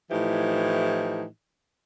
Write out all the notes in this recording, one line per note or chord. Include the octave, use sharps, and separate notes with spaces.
A2 E3 F3 D#4 G4